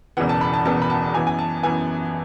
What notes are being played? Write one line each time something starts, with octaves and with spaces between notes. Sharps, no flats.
E1 E2 C#3 E3 B3 F#5
A5
B5
A5
E1 E2 C#3 E3 B3 A5
B5
A5
F#2 E3 B3 G#5
G#5
A5
F#2 E3 B3 G#5